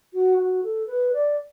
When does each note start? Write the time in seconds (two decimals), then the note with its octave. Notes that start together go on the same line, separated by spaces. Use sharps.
0.14 F#4
0.38 F#4
0.63 A4
0.87 B4
1.13 D5